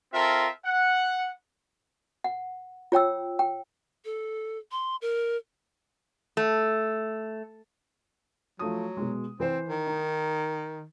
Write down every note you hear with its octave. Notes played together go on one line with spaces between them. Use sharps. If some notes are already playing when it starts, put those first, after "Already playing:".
C4 F4 A4 A#4 E5
F#5
F#5
F4 C#5 G5 E6
G5
A4
C6
A#4
A3
F3 F#3 A3 D#6
B2 G#3
E3 C4 C5
D#3
D#4